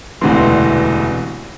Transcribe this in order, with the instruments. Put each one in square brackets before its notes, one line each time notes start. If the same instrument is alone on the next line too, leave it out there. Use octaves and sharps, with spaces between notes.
[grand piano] E1 D2 C3 E3 C6